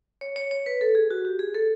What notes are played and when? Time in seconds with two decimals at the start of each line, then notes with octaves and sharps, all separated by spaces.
0.21 C#5
0.36 C#5
0.51 C#5
0.66 B4
0.81 A4
0.95 G#4
1.11 F#4
1.25 G4
1.39 G#4
1.55 A4